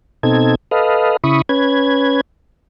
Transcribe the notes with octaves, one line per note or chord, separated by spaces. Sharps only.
B2 C4 D#4 A4 G#6
A4 B4 D#5 F5
C#3 E4 B5 C#6 D#6
C#4 B4 G#6